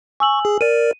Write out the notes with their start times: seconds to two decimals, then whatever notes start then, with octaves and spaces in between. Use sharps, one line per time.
0.20 G#5 C#6 E6 F#7
0.45 G#4
0.61 A#4 D5 D#7